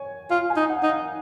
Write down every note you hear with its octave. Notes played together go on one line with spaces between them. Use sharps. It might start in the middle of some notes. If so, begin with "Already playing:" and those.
Already playing: C#5 G#5
F4 F5
G#5
D#4
F#5
D#4
F5